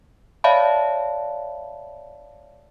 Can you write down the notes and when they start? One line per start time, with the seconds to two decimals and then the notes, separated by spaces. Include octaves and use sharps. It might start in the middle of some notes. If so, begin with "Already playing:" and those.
0.44 C#5 D5 E5 F5 A5 B5